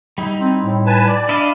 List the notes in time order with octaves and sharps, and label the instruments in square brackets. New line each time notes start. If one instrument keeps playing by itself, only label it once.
[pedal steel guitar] G3 D#4 E4
[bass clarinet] C4
A2
[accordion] B4 G#5 A5
D5
[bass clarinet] D4 [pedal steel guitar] E4 D#5 F5